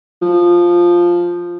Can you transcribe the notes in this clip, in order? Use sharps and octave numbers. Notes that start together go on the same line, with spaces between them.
F3